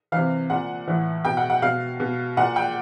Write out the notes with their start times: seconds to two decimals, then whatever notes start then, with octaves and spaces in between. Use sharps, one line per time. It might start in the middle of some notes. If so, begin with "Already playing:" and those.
0.12 C3 E3 F5
0.50 A#2 F#5
0.88 A2 E3
1.25 B2 G5
1.37 F#5
1.50 F#5
1.62 B2 F5
2.00 B2
2.37 A#2 F#5
2.56 G5